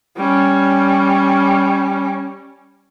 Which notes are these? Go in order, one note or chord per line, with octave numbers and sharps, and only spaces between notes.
G3 C#4